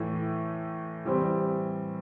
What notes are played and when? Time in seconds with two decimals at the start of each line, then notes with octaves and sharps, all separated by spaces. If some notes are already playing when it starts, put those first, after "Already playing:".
Already playing: A2 E3 A3
1.05 E3 G3 C4